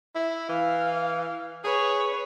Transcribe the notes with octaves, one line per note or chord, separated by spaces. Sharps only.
E4
E3 F5
G#4 B4 C#5